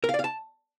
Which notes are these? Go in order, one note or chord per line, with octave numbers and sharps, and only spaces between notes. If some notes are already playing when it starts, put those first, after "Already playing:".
A#4
F5
D5
F5
A5